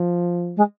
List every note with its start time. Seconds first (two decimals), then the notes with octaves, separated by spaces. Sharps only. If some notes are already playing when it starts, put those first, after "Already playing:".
Already playing: F3
0.56 G#3